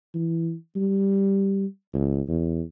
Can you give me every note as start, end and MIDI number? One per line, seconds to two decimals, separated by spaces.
0.14 0.54 52
0.76 1.66 55
1.94 2.21 37
2.28 2.62 40